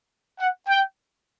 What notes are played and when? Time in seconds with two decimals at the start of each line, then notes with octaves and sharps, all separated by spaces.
0.40 F#5
0.68 G5